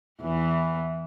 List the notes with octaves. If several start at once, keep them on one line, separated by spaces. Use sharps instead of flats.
E2 E3